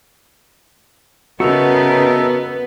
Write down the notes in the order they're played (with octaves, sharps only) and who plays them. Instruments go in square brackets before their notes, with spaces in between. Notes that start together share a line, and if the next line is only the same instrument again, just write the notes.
[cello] C#3 [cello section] B3 [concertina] D#4 A4 E5 [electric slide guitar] F#4 A#4